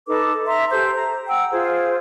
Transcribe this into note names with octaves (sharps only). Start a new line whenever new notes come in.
D#4 A4 B4 D6
E5 A#5 C6
G4 A4 C5 G6
A#5
F#5 G5 E6
F4 G#4 C5